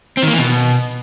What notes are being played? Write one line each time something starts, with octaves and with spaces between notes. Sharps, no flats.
C4
D#3
A#3
E3
B2